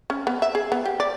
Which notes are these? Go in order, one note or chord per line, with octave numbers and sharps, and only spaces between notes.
C#4
B3
E5
G#4
B3
G4
D5